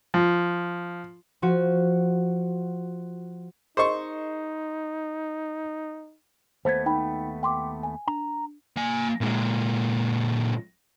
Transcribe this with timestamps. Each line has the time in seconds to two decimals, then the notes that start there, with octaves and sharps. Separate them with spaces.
0.14 F3
1.42 F3 F#4
3.77 D#4 G#4 A#4 C5 D#5 C#6
6.65 D#2 A3 B3 C5 G#6
6.86 D#4 G5 B5
7.43 G5 C6 D6
7.83 G#5
8.08 D4 A#5
8.77 A#3 G#5
9.21 A#2 G#3